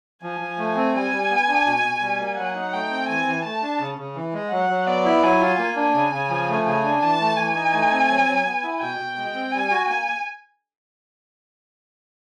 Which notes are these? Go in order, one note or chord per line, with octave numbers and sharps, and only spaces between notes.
F3 G#5
F3
A3
C4
G3 G#5
G3
B3
D4
B2
B2
G3
A#3
F#3 F#5
D#4
A3 G5
C4
E3 G#5
E3
A3 A5
D4
C#3
C#3
E3
G#3
F#3 F#5
F#3
B3 D5
E4
F#3 G#5
F4
A#3 G#5
D4
C#3
C#3
F3
A3
C#3 G#5
D4
E3 A5
A3
E3 G#5
D#4
A3
C4
F#3
F#3
B3
E4
B2 G5
B2
G#3
C4
G3 G#5
F#4
A#3 G#5